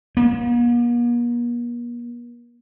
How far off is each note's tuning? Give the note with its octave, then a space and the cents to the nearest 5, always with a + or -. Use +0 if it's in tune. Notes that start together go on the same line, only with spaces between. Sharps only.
A#3 +45